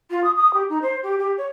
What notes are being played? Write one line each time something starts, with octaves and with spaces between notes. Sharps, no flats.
F4
D#6
D#6
G4
D#4
C5
G4
G4
C#5